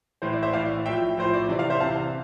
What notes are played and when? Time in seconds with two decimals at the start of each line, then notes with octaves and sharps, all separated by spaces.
0.22 A2 E3 C5
0.33 D5
0.43 C5 E5
0.53 A2 E3 D5 F5
0.86 A2 F3 E5 G5
1.17 A2 F3 C5
1.34 D5
1.48 C3 E3 D5
1.59 D5 F5
1.70 C5 E5
1.80 C3 E3 F5 A5